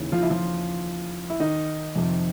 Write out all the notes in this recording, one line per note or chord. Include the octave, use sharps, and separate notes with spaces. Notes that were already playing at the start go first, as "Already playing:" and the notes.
Already playing: D#2 C#3 E3
F3 F4
E4
F3 F4
E4
D#3 D#4
F2 C3 F3